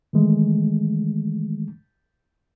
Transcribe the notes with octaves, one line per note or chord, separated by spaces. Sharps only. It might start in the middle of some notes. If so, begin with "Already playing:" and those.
D#3 E3 G#3 A3